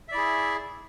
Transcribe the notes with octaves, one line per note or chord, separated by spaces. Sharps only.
E4 G#4 D5 E5